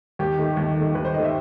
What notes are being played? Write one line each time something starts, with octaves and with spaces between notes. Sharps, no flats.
D#2 G4
D#3 A3
D#2
D#3 A3
D#2 B4
C5
D#3 A3 D#5
E5